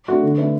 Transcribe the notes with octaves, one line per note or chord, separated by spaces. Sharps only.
A3 D4 F#4
D3 A4
A3 D4 B4